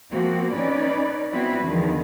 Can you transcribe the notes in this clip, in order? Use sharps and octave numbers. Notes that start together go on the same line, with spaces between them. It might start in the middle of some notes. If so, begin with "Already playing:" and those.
F3 A#3 C4 F#4
C#4 D#4 B4 D5
B3 C4 E4 F#4 B4
E2 D3 D#3 F3